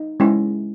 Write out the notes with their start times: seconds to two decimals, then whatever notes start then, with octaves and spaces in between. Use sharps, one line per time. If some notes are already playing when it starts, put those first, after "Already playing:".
Already playing: D#4
0.20 G#3 C#4 E4